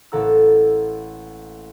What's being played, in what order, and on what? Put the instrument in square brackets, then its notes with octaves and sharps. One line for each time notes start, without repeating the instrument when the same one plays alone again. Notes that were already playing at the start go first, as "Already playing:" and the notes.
[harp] A1 A#3 A4 F#5 A#5 E6